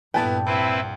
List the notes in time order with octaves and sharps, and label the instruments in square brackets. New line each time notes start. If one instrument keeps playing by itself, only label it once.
[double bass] G2 A#2 [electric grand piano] B3 E4 B4 [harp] G5 A5 D6
[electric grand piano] C2 [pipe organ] C4 E4 B4